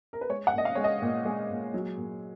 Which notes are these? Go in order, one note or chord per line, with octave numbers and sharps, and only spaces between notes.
A#4
B4
G#3 C#5
F#5
A#2 D#5
F5
G#3 C#5
D#5
A#2
G#3
A#2
F#3
A#2